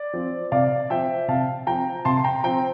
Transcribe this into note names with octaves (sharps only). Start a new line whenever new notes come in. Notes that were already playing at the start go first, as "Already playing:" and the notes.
Already playing: D5
F3 C4
C3 D5 F5
F3 C4 E5 G5
C3 F5 A5
F3 C4 G5 A#5
C3 A5 C6
C6
G5 A#5
F3 C4 G5 A#5